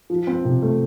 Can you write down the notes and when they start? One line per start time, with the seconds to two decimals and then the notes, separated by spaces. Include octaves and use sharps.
0.10 F3
0.27 C4
0.45 C3
0.62 A3